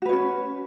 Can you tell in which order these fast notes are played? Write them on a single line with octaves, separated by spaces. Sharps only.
F#4 B4 C#5 C#4